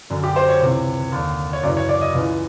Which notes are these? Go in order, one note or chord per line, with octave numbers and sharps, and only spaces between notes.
F#2 D3
G4
C5
C#5
C#2 C3 E3
D#2 D3
C#5
F#2 C#3 E3 D5
C#5
D5
D#5
C#2 C#3 E3